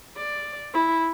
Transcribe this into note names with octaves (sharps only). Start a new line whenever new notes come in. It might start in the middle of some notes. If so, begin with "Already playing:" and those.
D5
E4